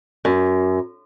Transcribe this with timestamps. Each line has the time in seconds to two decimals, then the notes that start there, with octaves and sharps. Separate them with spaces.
0.25 F#2